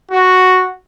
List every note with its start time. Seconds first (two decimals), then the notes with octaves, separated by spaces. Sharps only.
0.11 F#4